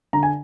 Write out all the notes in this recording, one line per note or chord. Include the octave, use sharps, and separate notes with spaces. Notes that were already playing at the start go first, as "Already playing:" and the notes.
D3 A#5
G#5